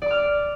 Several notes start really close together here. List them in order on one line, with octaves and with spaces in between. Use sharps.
D5 D6 F6